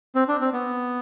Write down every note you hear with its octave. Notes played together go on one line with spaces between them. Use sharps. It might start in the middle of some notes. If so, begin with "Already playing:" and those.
C4
D4
C4
B3